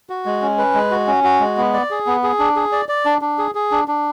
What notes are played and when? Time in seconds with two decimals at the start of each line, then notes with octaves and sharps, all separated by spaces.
0.10 F#4
0.26 G#3
0.42 C#4
0.58 B4
0.74 G#3
0.91 F#4
1.07 C#4
1.24 F#4
1.40 G#3
1.57 B3
1.73 D5
1.91 G#4
2.07 B3
2.23 G#4
2.39 D4
2.56 G#4
2.72 D5
2.89 D5
3.05 D4
3.22 D4
3.38 G#4
3.55 G#4
3.71 D4
3.88 D4